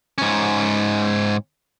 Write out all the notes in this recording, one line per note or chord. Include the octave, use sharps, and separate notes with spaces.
G#2 C#4